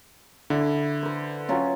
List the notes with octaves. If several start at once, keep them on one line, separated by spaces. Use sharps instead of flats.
D3 E4
B4 C5
F#3 C#4 F4